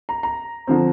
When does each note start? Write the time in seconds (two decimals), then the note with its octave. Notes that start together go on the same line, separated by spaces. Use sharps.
0.09 A#5
0.23 A#5
0.67 D3 F3 C4